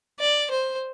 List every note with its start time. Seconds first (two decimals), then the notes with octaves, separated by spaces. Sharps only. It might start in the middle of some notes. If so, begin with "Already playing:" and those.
0.20 D5
0.51 C5